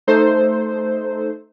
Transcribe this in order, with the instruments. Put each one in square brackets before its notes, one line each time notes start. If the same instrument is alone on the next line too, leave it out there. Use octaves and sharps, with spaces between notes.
[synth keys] A3 D#4 A4 C5